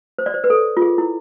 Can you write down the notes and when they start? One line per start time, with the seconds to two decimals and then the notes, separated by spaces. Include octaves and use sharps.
0.19 C5
0.26 D5
0.34 C5
0.44 B4
0.50 A4
0.77 F4
0.82 G#4
0.98 E4